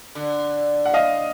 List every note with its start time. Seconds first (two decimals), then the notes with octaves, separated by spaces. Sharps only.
0.15 D3
0.86 F#5
0.94 D#5 F5